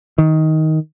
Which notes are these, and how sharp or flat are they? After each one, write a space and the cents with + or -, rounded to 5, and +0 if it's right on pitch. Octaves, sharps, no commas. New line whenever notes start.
D#3 +15